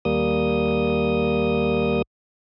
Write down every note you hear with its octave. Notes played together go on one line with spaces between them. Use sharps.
D#2 G3 A#3 D#6